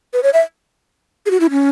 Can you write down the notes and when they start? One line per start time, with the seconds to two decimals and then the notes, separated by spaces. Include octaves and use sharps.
0.13 B4
0.23 C#5
0.33 E5
1.26 G#4
1.30 F#4
1.40 E4
1.50 C#4